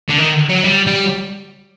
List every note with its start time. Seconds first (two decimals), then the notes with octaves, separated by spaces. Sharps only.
0.09 D3
0.18 D#3
0.49 F#3
0.64 G3
0.87 G3